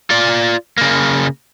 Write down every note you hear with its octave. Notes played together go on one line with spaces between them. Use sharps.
F4 D5
C#3 A#3